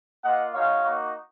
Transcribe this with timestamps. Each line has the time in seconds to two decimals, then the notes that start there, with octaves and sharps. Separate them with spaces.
0.24 A#3 F4 D#5 F#5
0.53 G#3 D#4 F#4 C#5 F5
0.84 A#3 D#4 F#4